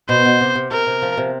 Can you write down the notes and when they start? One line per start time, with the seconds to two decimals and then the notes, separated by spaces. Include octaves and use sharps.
0.09 B2 C5
0.25 B2
0.41 C3
0.55 C3
0.71 C3 A#4
0.86 C3
1.02 F3
1.17 C3